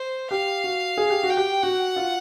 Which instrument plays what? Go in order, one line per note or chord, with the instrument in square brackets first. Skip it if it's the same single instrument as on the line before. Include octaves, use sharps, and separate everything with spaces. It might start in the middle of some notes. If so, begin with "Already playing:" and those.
Already playing: [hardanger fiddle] C5
[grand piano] G4 [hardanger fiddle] F5
[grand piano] F#4
G#4
G4
F#4
[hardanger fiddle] G5
[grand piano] G4
[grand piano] F#4 [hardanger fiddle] F#5
[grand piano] F4